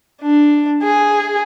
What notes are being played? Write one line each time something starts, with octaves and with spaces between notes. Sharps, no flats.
D4
G#4